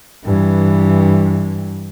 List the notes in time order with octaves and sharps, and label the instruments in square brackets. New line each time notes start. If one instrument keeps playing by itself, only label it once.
[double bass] G2 E3